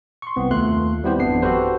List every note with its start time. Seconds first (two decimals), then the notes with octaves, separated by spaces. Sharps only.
0.22 C6 C#6
0.36 C2 B3 C4
0.51 D#2 A3 F4 C6 F#6
1.03 G3 B3 C4 E4 G4 C5
1.18 G#1 F2 B3 D4 C7
1.42 F#4 G4 A4 B4 C5